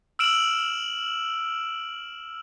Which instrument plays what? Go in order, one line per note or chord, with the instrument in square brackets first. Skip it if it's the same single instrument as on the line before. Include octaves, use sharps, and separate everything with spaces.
[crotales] E6 F6 D7 E7 F#7